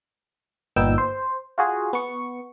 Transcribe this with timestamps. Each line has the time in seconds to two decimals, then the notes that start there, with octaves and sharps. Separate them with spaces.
0.76 G1 A#2 B3 D#4 G5 E6
0.98 C5
1.58 F4 F#4 G#4
1.93 B3 C#6